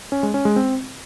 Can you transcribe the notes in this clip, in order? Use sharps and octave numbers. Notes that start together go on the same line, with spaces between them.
C#4
G#3
C#4
G#3
C4